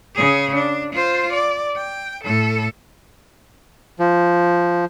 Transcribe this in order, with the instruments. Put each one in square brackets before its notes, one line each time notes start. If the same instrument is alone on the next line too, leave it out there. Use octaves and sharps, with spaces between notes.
[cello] C#3 G#4
D4
F4 C5
D5
G5
A2 A4
[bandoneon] F3